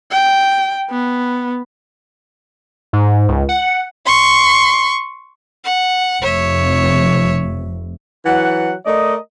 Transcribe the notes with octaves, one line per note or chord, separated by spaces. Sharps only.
G5
B3
G#2
C#2
F#5
C6 C#6
F#5
F1 F2 C#5 E5
E3 F#3 F#5
A3 A#4 D5 D#5